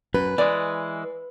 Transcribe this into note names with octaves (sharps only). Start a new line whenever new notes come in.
F#2 B4
E3 G#3 D5